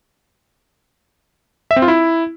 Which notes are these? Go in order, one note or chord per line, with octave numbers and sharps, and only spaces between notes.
E5
C4
F4
E4